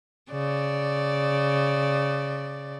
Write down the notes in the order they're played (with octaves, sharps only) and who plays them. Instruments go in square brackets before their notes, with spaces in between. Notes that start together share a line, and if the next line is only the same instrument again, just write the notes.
[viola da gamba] C#3 D5